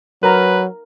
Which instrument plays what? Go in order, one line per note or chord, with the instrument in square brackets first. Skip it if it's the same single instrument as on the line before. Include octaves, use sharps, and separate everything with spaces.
[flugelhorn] F#3 [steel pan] A#4 A#5 [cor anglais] B4